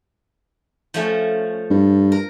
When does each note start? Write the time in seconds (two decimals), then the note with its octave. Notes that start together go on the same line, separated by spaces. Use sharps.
0.94 F3 A3 C#4
1.70 G2
2.12 A#4